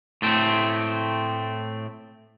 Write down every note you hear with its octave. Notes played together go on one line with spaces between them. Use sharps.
A2 A3 C4